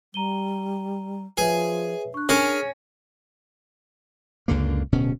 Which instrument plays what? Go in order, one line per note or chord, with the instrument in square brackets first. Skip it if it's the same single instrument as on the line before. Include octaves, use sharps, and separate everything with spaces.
[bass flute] G3 [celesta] A#5 D#7 G7
[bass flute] F3 [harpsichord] G#4 [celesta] B4 C#5 E5
[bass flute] D4 [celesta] C#6 F#6
[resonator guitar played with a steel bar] C#4 [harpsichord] G#4 A#4 [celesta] A#6
[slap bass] C#2 F#2 D3 A#3
D1 B2 C#4